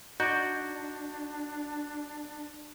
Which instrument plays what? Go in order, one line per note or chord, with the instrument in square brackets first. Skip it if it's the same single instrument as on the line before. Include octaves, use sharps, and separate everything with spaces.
[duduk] D4 [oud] D#4 [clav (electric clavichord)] F#4 D5 [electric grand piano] G6